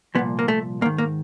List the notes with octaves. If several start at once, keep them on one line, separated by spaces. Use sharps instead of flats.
C2 A#2 F3 B3
A#3
A3
G#2 D#3 A#3
A#3